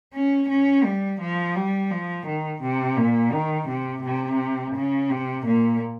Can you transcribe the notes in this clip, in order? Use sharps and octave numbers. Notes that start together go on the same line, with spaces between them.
C#4
C#4
G3
F3
G3
F3
D#3
C3
A#2
D#3
C3
C3
C#3
C3
A#2